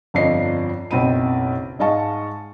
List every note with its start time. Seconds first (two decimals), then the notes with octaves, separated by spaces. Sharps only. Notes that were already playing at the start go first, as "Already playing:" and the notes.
0.14 G1 F2 F3 D5 D#5 C7
0.91 F#1 B1 C4 D#5 B5 D#7
1.79 G#2 G#3 D#5 F5 A5 C#6